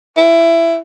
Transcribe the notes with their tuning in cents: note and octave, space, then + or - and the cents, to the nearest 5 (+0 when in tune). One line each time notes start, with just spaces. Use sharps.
E4 +15